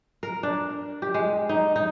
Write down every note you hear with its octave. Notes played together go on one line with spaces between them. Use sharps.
A#4
D4
G4
G#3
D#4
D#4